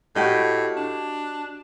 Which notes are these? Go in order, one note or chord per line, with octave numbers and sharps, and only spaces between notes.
A2 F#4 G4 D#5
D4